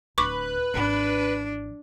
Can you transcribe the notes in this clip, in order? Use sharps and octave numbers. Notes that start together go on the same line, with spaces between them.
D1 B4 C#6 D6
G#1 E3 D4